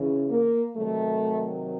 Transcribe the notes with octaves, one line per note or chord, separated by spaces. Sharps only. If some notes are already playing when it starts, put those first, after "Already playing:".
Already playing: C#3 E3
A#3
C3 D#3 F#3 A3